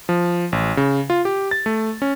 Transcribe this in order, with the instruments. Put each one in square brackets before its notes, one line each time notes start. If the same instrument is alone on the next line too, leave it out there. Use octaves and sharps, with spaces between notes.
[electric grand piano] F3
A1
C#3
F4
G4
A6
A3
C#4